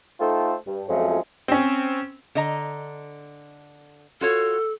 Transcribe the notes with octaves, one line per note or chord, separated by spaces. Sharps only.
A3 D#4 F4 A4 C5 G5
G2
F2 F3 F#3 G#3 A3 C#4
C4 C#4
D3 D#5 A#5
F4 F#4 A4 C#5